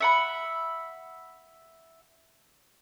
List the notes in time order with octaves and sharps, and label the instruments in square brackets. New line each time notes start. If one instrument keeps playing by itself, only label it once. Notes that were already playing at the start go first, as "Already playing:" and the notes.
[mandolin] E5 F#5 B5